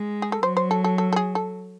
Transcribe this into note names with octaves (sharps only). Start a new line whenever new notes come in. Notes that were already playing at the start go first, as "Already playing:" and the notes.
Already playing: G#3
G#4
A4
F#3 C5
C5
A4
A4
A4
A4
G#4
A4